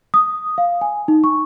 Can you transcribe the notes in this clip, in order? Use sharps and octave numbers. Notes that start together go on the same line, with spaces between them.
D#6
F5
G#5
D#4
C#6